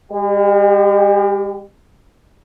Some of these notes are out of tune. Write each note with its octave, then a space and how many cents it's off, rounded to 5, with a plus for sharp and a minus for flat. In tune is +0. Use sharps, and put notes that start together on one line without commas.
G#3 -45 G4 +0